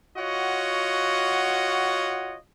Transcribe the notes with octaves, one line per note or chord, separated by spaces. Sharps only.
F4 F#4 C#5 D#5 F#5